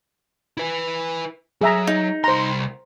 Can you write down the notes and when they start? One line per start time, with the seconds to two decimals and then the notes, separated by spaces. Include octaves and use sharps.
0.57 E4 B4
1.61 F#3 G#4 E5 A#5
1.87 D#4
2.24 C2 C5 A#5 C6